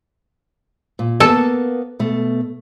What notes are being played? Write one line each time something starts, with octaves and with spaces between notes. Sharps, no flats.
A#2
A#3 B3 A4 A5
B2 A3